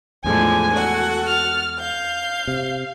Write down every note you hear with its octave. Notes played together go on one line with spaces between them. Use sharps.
E2 A2 D3 F3 G#3 G#5
F#4 A4 F#5
F6 A6
F5 G6
C3